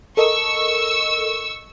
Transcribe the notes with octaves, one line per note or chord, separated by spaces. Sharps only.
A4 A#4 D#5 C#6 E6